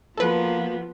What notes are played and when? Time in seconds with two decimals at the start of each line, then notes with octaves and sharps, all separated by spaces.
0.17 F3 A#3 B3 F4 F#4 A4 B4